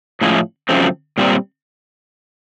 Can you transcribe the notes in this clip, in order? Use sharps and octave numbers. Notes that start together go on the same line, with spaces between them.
A2 F3 G#3 C#4 E4
F#2 C#3 F3 A3 C4
A#2 G3 C4